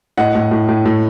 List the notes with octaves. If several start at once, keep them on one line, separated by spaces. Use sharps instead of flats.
A2 D#5 F#5
A2
A2
A2
A2